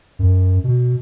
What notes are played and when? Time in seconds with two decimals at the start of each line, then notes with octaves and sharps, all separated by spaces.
0.19 F#2
0.64 B2